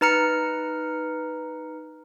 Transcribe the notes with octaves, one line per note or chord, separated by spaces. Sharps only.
D#4 B4 A#5 F6 C#7